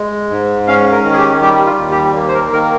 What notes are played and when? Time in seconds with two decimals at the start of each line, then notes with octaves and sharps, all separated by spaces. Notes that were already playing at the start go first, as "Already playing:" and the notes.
Already playing: G#3
0.31 G#2
0.67 C#4 F5
0.92 A#4
1.04 D#3
1.12 G#4
1.17 G4
1.42 G3 G4
1.66 F4
1.78 D#2
1.91 G4
2.16 A#3
2.28 C5
2.34 A#4
2.53 D#3 A#4